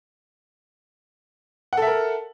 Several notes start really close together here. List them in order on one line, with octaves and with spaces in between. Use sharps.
F#5 A4 E5 A#4